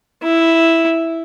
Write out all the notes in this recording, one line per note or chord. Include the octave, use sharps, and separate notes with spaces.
E4